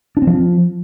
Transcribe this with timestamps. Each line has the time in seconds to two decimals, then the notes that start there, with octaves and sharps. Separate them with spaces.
0.17 D4
0.22 C4
0.27 F3